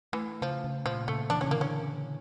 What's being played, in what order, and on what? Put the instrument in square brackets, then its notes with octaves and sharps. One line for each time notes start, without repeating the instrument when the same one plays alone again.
[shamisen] E3 [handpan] A3
[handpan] C#3 [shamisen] F3
[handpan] C#3
[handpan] A#2 [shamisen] F3
[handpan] C#3 [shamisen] A3
[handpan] E3 [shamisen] D4
[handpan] D3
[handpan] C#3 [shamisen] C#4
[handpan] D3 [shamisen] A#3
[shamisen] C#4